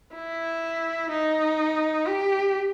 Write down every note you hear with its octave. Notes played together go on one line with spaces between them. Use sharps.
E4
D#4
G4